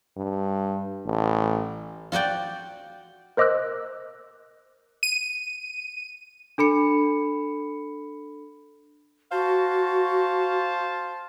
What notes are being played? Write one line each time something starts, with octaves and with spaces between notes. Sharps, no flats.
G2
A1
F4 F#4 D5 G5
A#4 C5 D#5 D6 E6 F#6
D#7
D4 A4 B5 C#7
F#4 C5 F5 A5